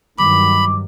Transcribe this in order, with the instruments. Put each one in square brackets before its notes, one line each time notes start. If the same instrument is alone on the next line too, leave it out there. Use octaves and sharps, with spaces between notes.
[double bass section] G2 D#3 F#3 [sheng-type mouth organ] B5 [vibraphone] D6